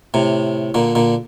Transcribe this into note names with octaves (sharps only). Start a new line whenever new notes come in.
A2 C3
A#2 D3
A#2 D3